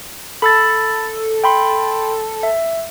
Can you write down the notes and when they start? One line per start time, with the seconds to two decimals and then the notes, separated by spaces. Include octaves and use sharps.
0.42 A4 B5 E6 A6
1.44 G5 B5 C6
2.43 E5